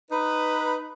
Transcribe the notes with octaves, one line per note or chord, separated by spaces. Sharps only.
D#4 B4